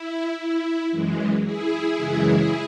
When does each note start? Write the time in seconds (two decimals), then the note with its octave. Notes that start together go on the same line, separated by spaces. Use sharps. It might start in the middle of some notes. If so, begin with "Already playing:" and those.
Already playing: E4
0.37 E4
0.91 F#2 E3 G#3
1.43 E4 G#4
1.97 F#2 C#3 E3 G#3